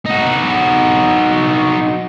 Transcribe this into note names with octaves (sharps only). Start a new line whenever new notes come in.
D#4 F#4